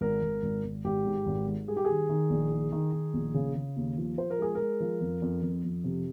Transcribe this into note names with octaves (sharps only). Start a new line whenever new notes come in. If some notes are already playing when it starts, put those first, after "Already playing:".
G#1 A#4
G#1
G#1
G#1
G#1 G4
G#2
G#1
G#2
G3 G#4
G4
D#3 G#4
D#3
A#1
D#3
D#3
D#3
A#1
C#3
C#3
D#2
F3
F3 C5
A#4
G#3 G#4
G#3 A#4
F3
F2
F2
F2
F2
C3